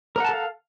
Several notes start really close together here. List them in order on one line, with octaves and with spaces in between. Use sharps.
A#4 F#5 A5 A4 F5